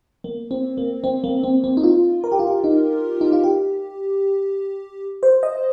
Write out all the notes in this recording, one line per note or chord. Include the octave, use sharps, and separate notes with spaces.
A#3
C4
A#3
C4
A#3
C4
C4
D#4
F4
A#4
G4
F4
G4
D#4
D#4
F4
G4
C5
D#5